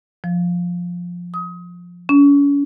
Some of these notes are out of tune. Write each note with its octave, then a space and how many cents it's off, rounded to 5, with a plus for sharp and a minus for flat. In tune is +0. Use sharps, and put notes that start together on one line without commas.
F3 +10
D#6 +25
C#4 +40